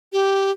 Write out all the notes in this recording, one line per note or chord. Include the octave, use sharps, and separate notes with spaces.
G4